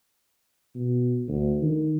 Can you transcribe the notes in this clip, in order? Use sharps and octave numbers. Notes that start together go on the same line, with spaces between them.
B2
D2
D#3